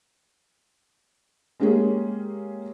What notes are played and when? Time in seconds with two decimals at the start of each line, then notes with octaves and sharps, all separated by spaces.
1.60 G#3 A#3 C#4 G4 G#4